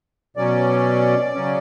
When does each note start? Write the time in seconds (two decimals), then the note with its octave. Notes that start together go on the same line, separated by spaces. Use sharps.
0.37 B2 F#3 C#4 D5
1.35 C#3 F#3 C#4